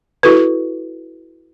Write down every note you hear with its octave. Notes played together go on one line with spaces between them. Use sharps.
E4 F#4 A4 B4